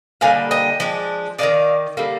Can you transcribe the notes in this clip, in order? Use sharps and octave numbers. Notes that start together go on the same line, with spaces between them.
D3 G3 A#3 D#4 F5 G#5
D#5 G5
F3 G#3 D4
D#3 A#3 D#4 D5 F5
D3 G3 A#3